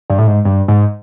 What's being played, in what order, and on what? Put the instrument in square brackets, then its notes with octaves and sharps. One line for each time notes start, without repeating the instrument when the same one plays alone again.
[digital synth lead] G2
A2
G#2
G2
G#2